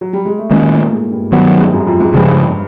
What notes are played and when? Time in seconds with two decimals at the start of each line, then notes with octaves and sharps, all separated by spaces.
0.01 F#3
0.13 G3
0.25 G#3
0.39 A3
0.49 A#2 D#3 G#3 A#3 C#4
0.70 A2 A3
0.91 G#2 G#3
1.11 G2 G3
1.32 G2 D#3 F#3 G3 B3
1.49 A3
1.57 G#3
1.65 G3
1.73 F#2 F#3
1.87 F2 F3
2.00 G#2 G#3
2.14 G2 C#3 F3 G3 G#3